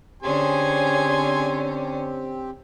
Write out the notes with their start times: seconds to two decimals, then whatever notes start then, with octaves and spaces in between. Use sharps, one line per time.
0.23 D3 C4 C#4 G4 G#4 G#5 C6